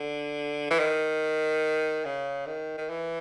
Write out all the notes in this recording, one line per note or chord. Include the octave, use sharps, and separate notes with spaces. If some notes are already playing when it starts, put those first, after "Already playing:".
Already playing: D3
E3
D#3
C#3
D#3
D#3
E3